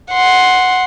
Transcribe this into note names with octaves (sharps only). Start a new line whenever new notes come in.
F#5 C6